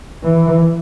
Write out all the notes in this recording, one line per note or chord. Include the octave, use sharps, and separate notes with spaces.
E3